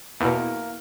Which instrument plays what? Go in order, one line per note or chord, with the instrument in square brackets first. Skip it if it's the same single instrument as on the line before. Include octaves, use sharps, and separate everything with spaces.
[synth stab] E2 B2 [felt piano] A#3 [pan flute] E4